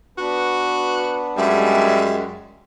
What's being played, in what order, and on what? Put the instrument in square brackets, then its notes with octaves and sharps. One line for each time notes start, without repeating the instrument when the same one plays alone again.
[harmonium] B3 D4 B4 [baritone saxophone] F#4
[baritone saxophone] F#2 [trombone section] G3 G#3 [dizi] E5